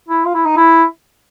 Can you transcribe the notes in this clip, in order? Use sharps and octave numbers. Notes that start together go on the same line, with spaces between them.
E4
F4
E4
D#4
E4